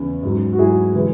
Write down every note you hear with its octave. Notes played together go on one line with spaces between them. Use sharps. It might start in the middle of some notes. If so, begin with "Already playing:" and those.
Already playing: E2 C#3
G#2 F#3
F#4
G#2 F#3 E4 G#4
E3 G#3